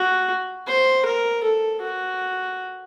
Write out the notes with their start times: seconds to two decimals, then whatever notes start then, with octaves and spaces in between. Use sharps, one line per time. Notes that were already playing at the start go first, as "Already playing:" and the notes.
Already playing: F#4
0.67 C5
1.06 A#4
1.44 A4
1.82 F#4